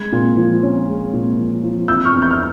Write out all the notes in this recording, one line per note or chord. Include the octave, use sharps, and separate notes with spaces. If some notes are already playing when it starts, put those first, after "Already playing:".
Already playing: G#3 G#6
A#2
F3
C#4
G#3
A#2
F3
F3
F3 E6 G6
C#6 F6
E2
G6
F6